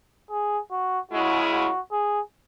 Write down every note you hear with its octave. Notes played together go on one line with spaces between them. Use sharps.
G#4
F#4
C#3 G#3 E4 F#4
F#4
G#4